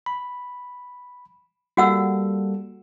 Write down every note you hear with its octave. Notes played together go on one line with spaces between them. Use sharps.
B5
G3 A#3 F#4 A4 F#5 E6